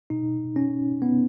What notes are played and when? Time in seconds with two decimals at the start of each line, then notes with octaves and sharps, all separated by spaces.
0.10 B2 D#4
0.56 C#4
1.02 B3